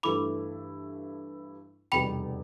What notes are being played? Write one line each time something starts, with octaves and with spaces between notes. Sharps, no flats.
G2 E3 A3 E4 B5 D6
F1 E2 B2 G3 G5 B5